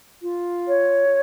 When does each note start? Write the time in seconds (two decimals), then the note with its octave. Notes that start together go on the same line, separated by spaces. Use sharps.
0.23 F4
0.67 C#5